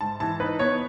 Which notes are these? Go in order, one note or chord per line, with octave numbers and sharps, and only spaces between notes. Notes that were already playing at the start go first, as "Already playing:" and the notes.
G#2 A5
E3 A5
D#4 B4
B3 C#5